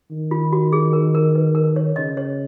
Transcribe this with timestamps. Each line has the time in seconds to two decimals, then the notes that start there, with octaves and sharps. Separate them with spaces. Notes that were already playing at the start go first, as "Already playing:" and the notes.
0.11 D#3
0.31 F4
0.53 F#4
0.72 G#4
0.93 A#4
1.15 A#4
1.35 B4
1.55 A#4
1.76 C#5
1.96 C#3 D#5
2.17 C#5